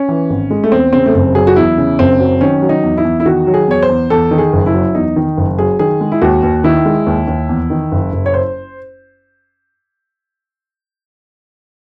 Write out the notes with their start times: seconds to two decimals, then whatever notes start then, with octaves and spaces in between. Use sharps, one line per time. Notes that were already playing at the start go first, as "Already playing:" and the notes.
Already playing: C#4
0.09 E3
0.30 G#1
0.51 G#3
0.64 A3
0.72 E2 C4
0.93 C#3 C4
1.06 A3
1.14 F#1 C4
1.35 F#3 G#4
1.47 F#4
1.56 E2 E4
1.78 C#3
1.99 F#1 C4
2.19 F#3
2.41 D#3 C#4
2.62 F#3
2.69 D#4
2.83 E2
2.97 E4
3.05 E2
3.20 E4
3.25 D#3 F#4
3.47 F#3
3.54 G#4
3.68 E2 C#5
3.82 C5
3.89 E2
4.10 E2 A4
4.31 D#3
4.38 G#4
4.53 F#1
4.66 E4
4.74 F#3
4.95 E2 D#4
5.16 D#3
5.37 F#1
5.59 F#3 G#4
5.79 D#3 G#4
6.01 G#3
6.12 E4
6.22 D#2 F#4
6.43 D#2
6.64 D#3 E4
6.85 G#3
7.07 D#2
7.27 D#2
7.49 E2
7.70 D#3
7.92 F#1
8.12 F#1
8.26 C#5
8.34 C5